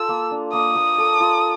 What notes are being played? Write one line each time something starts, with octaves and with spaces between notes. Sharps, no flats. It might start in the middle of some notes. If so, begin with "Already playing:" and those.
Already playing: F4 A4 E6
A#3
D4
A#3 D#6
A#3
A4
F4